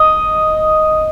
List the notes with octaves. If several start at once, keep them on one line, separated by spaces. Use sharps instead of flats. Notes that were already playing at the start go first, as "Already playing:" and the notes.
Already playing: D#5